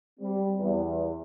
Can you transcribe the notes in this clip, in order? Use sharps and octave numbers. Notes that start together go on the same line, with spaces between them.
G3 C4
E2